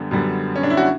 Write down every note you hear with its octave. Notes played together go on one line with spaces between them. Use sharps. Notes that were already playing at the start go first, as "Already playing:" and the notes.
Already playing: F#2 D3 G3 B3
F#2 D3 G3 B3
C#4
D4
E4
F#4